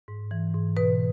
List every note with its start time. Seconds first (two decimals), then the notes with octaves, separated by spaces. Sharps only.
0.08 G#2
0.31 E3
0.54 G#2
0.77 B2 B4